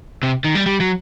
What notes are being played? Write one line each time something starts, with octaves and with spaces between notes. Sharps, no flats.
C3
D#3
G3
G3
F#3